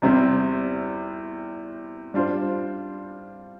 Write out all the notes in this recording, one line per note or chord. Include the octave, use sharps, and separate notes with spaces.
E2 C3 G3 C4 E4
G3 D4 F4 C5